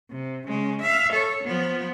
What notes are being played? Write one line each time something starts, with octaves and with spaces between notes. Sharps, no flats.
C3
C#3 G#3
E5 F5
A4 C#5
F3 B3